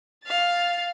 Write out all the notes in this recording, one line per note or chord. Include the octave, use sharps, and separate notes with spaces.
F5 A6